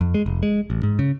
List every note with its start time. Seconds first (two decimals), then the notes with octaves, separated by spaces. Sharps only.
0.01 F2
0.14 G#3
0.26 F1
0.43 G#3
0.70 A1
0.83 G#2
0.99 C#3